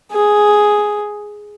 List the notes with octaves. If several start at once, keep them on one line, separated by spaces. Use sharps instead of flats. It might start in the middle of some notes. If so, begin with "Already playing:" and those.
G#4